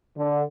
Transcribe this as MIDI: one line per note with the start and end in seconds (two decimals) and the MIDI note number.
0.17 0.43 50